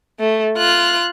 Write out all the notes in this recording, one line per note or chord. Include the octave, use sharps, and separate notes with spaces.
A3
F4 F#6